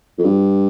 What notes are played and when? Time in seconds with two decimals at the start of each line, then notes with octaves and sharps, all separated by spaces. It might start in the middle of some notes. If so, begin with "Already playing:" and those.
0.18 F2
0.24 G2